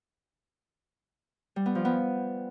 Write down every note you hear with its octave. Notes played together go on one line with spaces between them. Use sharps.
G3
B3
F3
B3